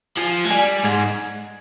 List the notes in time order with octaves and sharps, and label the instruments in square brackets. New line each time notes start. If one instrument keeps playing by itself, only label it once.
[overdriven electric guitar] F3 [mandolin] G#4
[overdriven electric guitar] G#3
[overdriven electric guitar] G3 [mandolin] D5 F5 G#5
[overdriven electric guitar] G#2 [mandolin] G#4